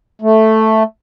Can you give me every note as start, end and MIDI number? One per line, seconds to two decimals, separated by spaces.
0.22 0.83 57